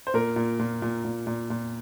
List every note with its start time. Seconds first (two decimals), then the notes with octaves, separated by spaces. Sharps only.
0.07 C5
0.14 A#2 A#4
0.36 A#2
0.59 A#2
0.82 A#2
1.05 A#2
1.27 A#2
1.50 A#2